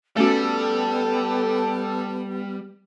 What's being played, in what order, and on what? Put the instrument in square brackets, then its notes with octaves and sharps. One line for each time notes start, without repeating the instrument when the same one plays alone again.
[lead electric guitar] G3 [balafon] A3 C#4 F#4 [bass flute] B3 [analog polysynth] A4